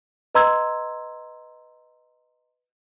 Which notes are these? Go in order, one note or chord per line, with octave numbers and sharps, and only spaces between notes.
B4 D#5 A#5 C6 E6 G#6